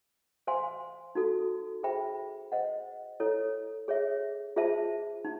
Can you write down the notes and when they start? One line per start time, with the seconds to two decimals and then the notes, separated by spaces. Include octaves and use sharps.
0.47 C5 F5 G#5 C6
1.15 D#4 F#4 A4
1.83 G#4 C5 E5 G5 B5
2.52 C5 D#5 F#5
3.20 E4 A4 C#5
3.88 G#4 C#5 E5
4.56 F4 G#4 C5 E5 A5
5.25 D#4